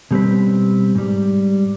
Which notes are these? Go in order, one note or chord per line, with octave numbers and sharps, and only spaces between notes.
B2 G3 C4 B4
G#2 G3